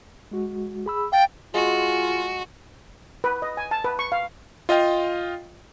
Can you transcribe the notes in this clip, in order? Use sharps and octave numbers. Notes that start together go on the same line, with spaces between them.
G#3 F#4
G#4 B5 E6
F5 G5 A6
G#3 F4 F#4
B4
D#5
G#5
A5
B4
C#6
F5
F4 D#5 F5 G5